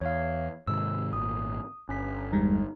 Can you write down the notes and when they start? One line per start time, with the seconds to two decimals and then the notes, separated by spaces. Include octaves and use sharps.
0.01 E2 C#5 F5
0.67 G#2 C3 D#3 E6
1.13 G#1 A#2 D#6
1.89 G1 C#4 B6
2.32 E2 G3 G#3 D#4